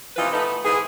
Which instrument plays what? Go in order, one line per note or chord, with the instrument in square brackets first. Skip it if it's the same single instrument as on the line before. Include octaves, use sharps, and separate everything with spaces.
[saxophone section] C3 E3 F3 D#4 F4 B4
A3 B3 D#4
G#2 E3 B3 G#4